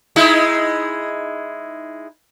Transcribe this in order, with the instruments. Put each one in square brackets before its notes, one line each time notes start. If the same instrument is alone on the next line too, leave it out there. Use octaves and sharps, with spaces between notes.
[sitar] G#3 D#4 E4